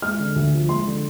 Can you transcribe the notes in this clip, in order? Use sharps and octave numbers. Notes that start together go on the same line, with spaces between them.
G#3 F6
D3
D2
F3
G#3 C6
D3